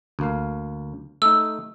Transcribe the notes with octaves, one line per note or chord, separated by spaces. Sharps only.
D2 A#3 F5
A3 D#4 E6